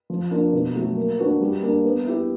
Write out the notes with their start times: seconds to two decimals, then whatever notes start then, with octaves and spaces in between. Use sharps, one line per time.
0.10 F3
0.31 A#3 D4 F4
0.53 B2
0.75 F#3 A3
0.96 A#3
1.19 D4 F#4 B4
1.41 G3
1.63 A#3 D4
1.84 B3
2.07 E4 G4